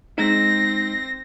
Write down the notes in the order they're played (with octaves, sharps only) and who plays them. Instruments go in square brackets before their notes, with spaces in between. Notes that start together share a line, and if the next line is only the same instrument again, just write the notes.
[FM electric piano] G#3 D#4 [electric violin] C4 A#6